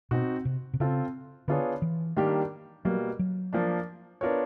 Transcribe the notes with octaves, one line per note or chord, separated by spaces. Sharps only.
B2 C4 D#4 F#4
C3
C3
C#3 C4 F4 A4
D3 B3 D4 F4 G#4 C#5
E3
D#3 G3 A#3 D4 G4
B2 F#3 G3 A#3
F#3
F3 A#3 D4
B3 D4 F4 A#4 C#5